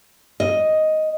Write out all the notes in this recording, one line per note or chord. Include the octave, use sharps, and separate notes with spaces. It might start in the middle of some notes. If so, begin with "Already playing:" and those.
D#5